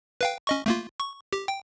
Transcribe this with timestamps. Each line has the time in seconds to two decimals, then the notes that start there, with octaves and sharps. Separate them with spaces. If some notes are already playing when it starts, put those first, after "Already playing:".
0.21 B4 F5 G5
0.47 C#4 D#5 C#6
0.66 A3 A#3 F4
1.00 C#6
1.33 G4
1.48 G5